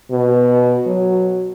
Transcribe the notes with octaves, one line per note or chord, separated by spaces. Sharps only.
B2
F#3